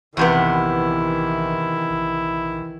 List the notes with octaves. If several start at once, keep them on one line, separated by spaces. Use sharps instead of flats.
A#1 E2 C3 D#3 E3 B3 E4
A#1